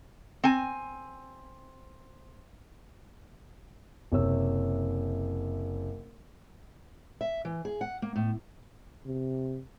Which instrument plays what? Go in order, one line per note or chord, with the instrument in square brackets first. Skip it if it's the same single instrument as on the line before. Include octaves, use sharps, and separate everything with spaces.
[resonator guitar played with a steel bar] C4 G#5
[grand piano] F#1 C3 C#5 E6
[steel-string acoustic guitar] E5
E3
G#4
F#5
A#3
A2
[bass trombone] C3